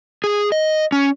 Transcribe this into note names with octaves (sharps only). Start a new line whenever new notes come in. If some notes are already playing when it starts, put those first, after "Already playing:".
G#4
D#5
C#4